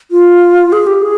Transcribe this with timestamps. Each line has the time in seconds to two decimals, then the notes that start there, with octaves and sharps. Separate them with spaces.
0.11 F4
0.72 G#4
0.87 G4
1.03 G#4